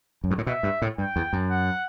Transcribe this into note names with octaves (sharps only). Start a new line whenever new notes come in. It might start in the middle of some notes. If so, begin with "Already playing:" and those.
F#2
G2
A2
B2 E5
G2
A2
G2 G5
E2
F#2
F#5